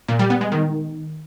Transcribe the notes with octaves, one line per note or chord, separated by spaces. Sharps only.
A#2
G3
B3
G#3
D#3